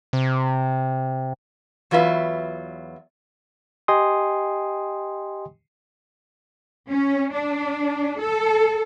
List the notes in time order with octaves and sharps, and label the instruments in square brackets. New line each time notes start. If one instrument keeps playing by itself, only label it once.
[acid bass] C3
[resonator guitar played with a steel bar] E2 F#3 F4 B4 E5
[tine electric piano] G4 D#5 G5 G#5 C6 D#6
[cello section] C#4
D4
A4